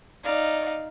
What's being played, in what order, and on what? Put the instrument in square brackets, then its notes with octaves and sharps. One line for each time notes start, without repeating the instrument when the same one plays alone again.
[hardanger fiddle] D#4 F5 [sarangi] D5